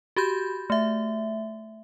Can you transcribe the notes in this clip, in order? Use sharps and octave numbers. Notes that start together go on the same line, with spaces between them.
F#4 G4 B5 G6
A3 E5